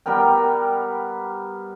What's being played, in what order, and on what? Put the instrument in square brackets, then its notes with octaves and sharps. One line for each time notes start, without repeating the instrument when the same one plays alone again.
[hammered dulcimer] G3 B3 A#4 G5